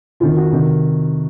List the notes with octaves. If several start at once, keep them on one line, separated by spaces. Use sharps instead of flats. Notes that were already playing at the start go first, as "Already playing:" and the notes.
F2 D#3 F4
F#4
C3 D#3